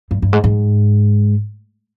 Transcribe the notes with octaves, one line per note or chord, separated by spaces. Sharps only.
G2
G2
G#2
G#2